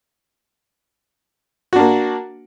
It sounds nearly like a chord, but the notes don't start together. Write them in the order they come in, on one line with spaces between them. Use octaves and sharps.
F#4 D4 A#3